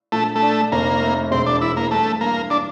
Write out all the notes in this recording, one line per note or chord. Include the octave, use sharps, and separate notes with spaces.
A#1 A3
A3
D4
F1 A#3
A3
E1 C4
D4
E3 E4
A#3
G2 A3
G2 A#3
D4